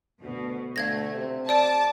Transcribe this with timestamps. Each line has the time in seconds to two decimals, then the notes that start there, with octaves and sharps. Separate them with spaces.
0.22 D2 B2
0.76 D2 A3 F5 G#6 A#6
1.14 C3
1.49 D5 A5 D6 D7